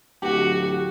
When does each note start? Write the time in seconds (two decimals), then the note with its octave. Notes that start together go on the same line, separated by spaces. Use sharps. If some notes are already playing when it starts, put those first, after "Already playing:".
0.22 D1 F#4 G4